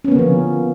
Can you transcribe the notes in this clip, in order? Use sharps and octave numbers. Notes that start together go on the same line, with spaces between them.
D3 F3 A#3 B3 C#4